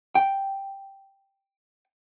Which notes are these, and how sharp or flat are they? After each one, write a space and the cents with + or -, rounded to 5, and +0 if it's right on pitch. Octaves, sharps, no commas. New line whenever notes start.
G5 +0